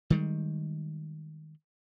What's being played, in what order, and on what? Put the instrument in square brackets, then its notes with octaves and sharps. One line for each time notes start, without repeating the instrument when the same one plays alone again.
[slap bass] D#3 G3 G#3